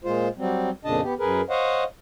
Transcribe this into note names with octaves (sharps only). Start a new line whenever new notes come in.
A#2 G#3 F4 C5
F#3 G3 C4
F2 A#2 C#3 D4 D#5 A5
B3 G4
F#2 G#4 A#4 B4
C5 C#5 D#5 F5 F#5